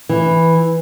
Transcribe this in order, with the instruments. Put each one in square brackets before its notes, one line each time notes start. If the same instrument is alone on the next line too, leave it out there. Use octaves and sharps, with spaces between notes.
[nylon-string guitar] E3